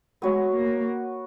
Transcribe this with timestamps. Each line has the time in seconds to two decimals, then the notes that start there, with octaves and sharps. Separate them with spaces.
0.22 G#3 B3 F#4 C#5
0.55 A#3